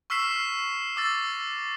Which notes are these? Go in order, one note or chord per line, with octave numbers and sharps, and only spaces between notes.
C#6 E6 F6 B6 C7 E7
D6 E6 A6 A#6